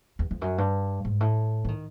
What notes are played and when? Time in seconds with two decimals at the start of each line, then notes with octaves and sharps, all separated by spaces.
0.19 E2
0.31 F2
0.41 F#2
0.58 G2
1.05 G#2
1.20 A2
1.65 E3
1.68 D#3